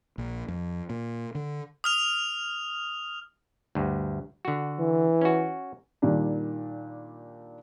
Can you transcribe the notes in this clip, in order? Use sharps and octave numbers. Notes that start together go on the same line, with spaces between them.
A#1
F2
A#2
D3
D#6 F6 F7
D2 G2
D3 F#4
E3
C#4 F#4
A#2 D#3 G3 D4